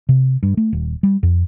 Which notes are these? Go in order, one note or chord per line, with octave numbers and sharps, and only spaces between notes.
C3
G2
A3
D#1
G3
F2